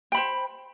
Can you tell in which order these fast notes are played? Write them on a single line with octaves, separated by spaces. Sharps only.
G5 B5 C5